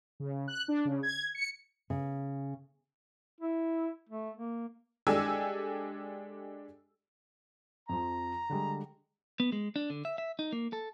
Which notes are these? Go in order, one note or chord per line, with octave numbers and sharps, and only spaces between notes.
C#3
F#6
D4
C#3
G#6
C#7
C#3
E4
A3
A#3
G#3 D4 G4 A4 G#5 E6
F2 F3 A#5
D3 G3 G#3
B3
G#3
D4
D3
E5
E5
D#4
A#3
A4